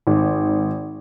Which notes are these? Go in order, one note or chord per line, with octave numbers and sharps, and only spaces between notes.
G#1